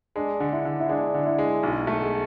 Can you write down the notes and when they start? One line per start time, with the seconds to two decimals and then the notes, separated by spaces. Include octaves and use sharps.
0.16 G#3 D4
0.40 D3
0.53 E4
0.65 D3
0.80 E4
0.89 G#3 D4
1.14 D3
1.26 E4
1.38 G#3
1.63 B1
1.87 A3
1.92 A4
2.00 G#4